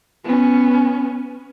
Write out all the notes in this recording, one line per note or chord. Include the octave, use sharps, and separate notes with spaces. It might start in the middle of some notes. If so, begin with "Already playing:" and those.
B3 C#4